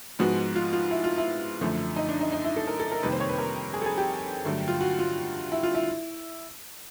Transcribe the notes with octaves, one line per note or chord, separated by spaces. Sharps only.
G#2 F3 G#3 B3 F#4
F4
F4
E4
F4
E4
F#2 D3 F3 A3
D#4
D4
D#4
D#4
E4
A4
A#4
A4
A#4
F2 C3 D#3 G3 A#3 B4
C5
C#5
B4
A#4
G#4
A4
G#4
G4
G2 D3 F#3 A3
F4
F#4
F4
E4
F4
E4